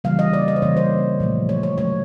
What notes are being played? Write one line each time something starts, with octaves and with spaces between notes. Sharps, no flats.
C#3 E3 G3 A#3 F5
D#5
D5
D#5
C5
C#3 E3 G3 A#3 C#5
C5
A#2 F3 A3
C#5
C#5
D3 F#3 A3 C#5